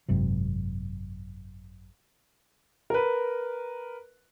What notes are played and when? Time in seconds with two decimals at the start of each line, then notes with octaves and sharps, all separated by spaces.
0.08 G#1 F#2 C3
2.90 A#4 B4